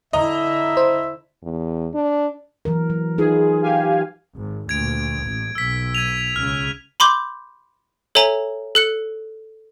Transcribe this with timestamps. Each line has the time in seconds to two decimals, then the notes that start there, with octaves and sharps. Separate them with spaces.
0.13 D3 E4 D#5 E5 A#5
0.77 C5
1.43 E2
1.94 D4
2.65 E3 F#3 A#4
2.90 F#3
3.18 D#4 F4 G#4 B4
3.62 G4 F5 G#5
4.37 G#1
4.69 D2 A#2 G#6 D7
5.25 A1
5.55 B1 E6 B6
5.95 G#6 D#7 F7
6.36 C#2 C#3 F6
7.00 B5 C6 D6 G6
8.15 A4 C#5 E5 G#5 A#5
8.75 A4 F#6 C#7